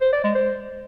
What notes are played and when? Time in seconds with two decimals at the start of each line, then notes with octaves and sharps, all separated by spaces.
0.01 C5
0.12 D5
0.24 G#3
0.35 C5